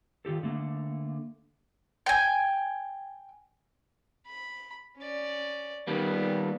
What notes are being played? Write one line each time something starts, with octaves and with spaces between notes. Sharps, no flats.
D#3 F4 G4 A4
D3 A3 A#3
G5 G#5
B5
C#4 D5
D#3 G3 A#3 B3